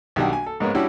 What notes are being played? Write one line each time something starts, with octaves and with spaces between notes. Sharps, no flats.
B1 D#3 G3 D4 F#5 G5
G#5
A4
G#2 G#3 A#3 B3 C#4
G3 C#4 D4 E4 F#4